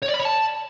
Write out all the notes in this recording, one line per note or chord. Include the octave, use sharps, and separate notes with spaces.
C#5
D5
B5
C#5
A5